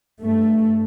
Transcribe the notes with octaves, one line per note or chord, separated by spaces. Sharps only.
G2 A3